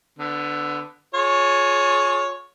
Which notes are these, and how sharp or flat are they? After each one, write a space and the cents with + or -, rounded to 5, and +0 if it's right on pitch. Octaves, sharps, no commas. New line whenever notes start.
D3 +0 B3 +20
F4 +30 G#4 +25 C#5 +0